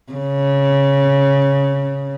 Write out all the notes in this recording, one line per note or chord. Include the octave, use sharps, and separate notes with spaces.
C#3